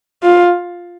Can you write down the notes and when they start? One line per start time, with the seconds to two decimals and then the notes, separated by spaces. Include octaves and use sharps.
0.23 F4